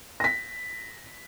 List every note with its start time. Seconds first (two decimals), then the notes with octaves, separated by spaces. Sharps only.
0.20 A#6 B6